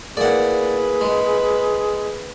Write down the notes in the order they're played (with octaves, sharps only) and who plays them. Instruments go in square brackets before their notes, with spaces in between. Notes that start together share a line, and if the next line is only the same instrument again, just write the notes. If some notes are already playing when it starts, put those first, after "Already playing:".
[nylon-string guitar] A#3 E4 [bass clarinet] G#4 [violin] B4 [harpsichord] D5 F#5
[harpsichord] G#3